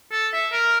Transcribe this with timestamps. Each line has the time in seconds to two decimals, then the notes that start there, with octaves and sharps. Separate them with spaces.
0.11 A4
0.33 E5
0.52 A#4